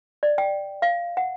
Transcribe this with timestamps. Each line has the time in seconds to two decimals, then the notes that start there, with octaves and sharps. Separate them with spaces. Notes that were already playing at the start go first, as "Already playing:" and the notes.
0.23 D5
0.38 G5
0.82 F5
1.17 F#5